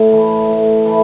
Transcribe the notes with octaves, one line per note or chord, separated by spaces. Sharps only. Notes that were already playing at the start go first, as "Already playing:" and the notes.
Already playing: A2
E3 A3
A2
E3 A3